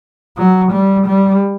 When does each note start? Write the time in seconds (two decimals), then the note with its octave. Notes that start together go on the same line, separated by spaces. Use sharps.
0.37 F#3
0.73 G3
1.07 G3